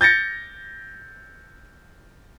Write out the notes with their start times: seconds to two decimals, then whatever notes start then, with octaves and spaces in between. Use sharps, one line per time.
0.01 G6 A6 A#6 C#7